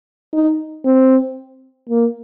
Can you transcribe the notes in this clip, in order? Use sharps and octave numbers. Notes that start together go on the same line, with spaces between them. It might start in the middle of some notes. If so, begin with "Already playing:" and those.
D#4
C4
A#3